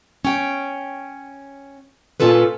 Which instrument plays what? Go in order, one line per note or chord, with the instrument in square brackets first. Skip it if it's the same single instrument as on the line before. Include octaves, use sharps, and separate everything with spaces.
[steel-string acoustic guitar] C#4 G5
A#2 A#3 C#4 F4 A4 B4